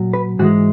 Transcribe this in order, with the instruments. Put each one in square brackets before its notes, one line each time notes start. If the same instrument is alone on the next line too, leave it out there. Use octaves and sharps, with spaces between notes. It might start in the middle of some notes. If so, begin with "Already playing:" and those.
Already playing: [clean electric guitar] A#2 F#3
B4
G#2 E3 G#3 F#4